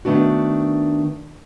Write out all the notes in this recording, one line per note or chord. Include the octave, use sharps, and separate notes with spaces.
D#3 A3 B3 D4 F#4